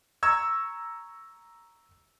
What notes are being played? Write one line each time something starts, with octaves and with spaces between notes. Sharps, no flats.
A#5 C#6 E6 G#6